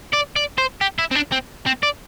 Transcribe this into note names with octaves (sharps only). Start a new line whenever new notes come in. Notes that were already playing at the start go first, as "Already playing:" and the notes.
D5
D5
C5
G4
E4
C4
D4
C4
C4
D5